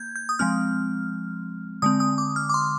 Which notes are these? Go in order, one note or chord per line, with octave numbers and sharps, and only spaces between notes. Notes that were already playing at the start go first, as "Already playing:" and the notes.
Already playing: A#3 G6 G#6
G6
D#6
F3 G#3 C4 F6
D3 G#3 C4 D#6
D#6
D6
F6
D6
C6